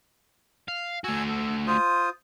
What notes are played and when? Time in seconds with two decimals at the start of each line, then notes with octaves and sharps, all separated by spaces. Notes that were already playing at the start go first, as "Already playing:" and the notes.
0.68 F5
1.04 A3 F#4 G#5 E6
1.28 A4
1.67 F4 C5 D#6